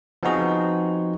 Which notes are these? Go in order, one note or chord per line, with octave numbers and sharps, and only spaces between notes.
F3 B3 C4 D#4 F#4 G#4